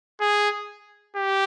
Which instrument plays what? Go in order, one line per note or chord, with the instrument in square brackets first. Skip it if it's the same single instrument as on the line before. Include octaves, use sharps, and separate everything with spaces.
[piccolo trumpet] G#4
G4